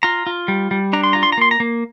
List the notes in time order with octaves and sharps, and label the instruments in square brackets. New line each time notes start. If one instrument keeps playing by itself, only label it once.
[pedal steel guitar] F4 A#5
F4
G3
G3
D4 A#5
C6
F4 A#5
C6
A#5
A#3 C6
A#5
A#3